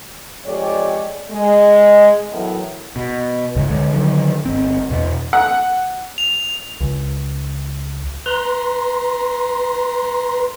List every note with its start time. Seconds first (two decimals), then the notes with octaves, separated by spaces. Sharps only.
0.44 F2 G#3 G4 C#5 D5
1.30 G#3
2.31 A2 E3 F#3 B3 A#4
2.96 B2
3.56 C#2 G#2 C#3
3.68 D3 G#3
3.93 D3 D#3 F#3
4.45 G1 C4
4.90 E2 B2
5.33 F#5
6.18 F7
6.80 C#2
8.26 B4 A#5 C6